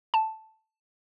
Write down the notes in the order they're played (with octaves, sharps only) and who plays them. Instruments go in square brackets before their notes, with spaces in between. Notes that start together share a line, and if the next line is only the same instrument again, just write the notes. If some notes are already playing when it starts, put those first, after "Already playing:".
[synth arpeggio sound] A5